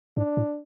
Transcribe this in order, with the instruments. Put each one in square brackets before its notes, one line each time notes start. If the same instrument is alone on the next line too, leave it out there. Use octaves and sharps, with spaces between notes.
[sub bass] G#2 [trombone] D4
[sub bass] A2